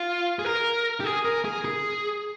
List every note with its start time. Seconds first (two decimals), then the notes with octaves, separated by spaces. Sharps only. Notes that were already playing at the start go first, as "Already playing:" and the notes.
Already playing: F4
0.39 G#4
0.45 A#4
1.00 G4
1.04 G#4
1.25 A#4
1.45 G#4
1.65 G#4